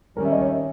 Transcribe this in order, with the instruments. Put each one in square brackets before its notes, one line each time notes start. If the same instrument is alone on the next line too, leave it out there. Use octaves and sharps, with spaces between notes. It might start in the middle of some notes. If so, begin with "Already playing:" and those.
[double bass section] D#3 G3 C#4 [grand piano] A#4
[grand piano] E5
D#5
C#5
E5